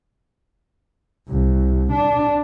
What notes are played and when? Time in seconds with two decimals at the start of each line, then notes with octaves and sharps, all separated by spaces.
1.29 C2
1.92 D4